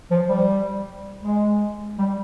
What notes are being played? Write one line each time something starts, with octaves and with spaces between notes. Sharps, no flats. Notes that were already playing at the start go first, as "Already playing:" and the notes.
F3
G3
G#3
G3